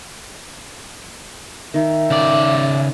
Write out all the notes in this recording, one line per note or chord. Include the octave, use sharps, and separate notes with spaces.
D#3 E5
C#3 D5